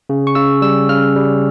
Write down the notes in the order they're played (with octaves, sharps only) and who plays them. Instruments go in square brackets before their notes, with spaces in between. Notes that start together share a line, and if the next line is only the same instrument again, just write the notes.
[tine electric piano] C#3
C#6
C#3 E6
G3 E6
C#3 F6
G3